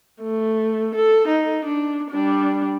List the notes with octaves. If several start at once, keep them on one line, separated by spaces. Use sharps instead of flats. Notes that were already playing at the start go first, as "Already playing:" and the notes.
A3
A4
D#4
D4
G3 D4